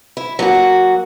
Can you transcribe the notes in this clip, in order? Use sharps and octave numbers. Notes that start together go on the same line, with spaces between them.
E4
F#3 A#3 F#4